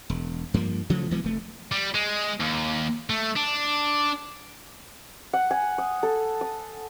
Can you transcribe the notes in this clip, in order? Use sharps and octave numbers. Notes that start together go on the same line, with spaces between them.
E1
G2 F3 A#3
C#3 E3 F3 A3
B1 E3 G#3 B3
F1 A3
G3
G#3
D#2
A3
D4
F#5
G#5
D#6
A4
D#6